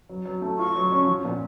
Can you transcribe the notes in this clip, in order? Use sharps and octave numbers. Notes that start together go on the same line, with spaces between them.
F#3
F#3
A3
F4 C#6
F#3
C#4
F3
A#2